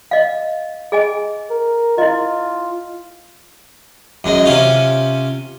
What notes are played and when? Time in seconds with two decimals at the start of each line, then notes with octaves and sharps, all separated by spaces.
0.11 D#5 F5
0.92 G#4 D#5 G#5
1.51 A#4
1.98 E4 F4 D#5
4.24 F#2 G#3
4.46 C3 C#4 F4